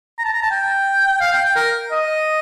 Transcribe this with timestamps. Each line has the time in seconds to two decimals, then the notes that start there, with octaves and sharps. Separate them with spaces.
0.18 A#5
0.25 A5
0.33 A#5
0.42 A5
0.51 G5
1.20 F5
1.33 G5
1.45 G5
1.56 A#4
1.92 D#5